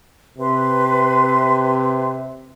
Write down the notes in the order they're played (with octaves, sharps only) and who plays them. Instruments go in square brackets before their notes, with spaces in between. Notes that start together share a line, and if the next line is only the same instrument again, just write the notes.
[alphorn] C3 [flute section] B4 C6